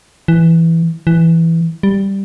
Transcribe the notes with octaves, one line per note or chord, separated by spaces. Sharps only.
E3
E3
G3